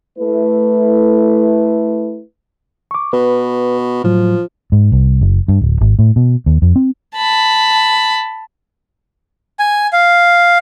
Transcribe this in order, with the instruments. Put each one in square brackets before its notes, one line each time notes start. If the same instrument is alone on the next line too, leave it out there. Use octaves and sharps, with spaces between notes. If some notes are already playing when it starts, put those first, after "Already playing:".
[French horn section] A3 E4 B4
[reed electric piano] C#6 D6
[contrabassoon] B2 [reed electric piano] B4
[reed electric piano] A2 F#3 [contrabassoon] F3
[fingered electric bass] G#2
C2
F#1
G2
D1
G#1
A2
B2
D#2
F2
C4
[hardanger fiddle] A5 B5
[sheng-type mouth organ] G#5
F5